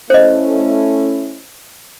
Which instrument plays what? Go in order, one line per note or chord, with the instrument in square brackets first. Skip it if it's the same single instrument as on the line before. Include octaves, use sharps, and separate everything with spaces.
[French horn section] A3 C#4 E4 [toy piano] C5 D#5